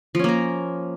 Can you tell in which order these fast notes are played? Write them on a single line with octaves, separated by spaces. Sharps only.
F3 C#4 A#3 A#4